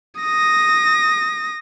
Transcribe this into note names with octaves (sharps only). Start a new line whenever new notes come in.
D#6 A#6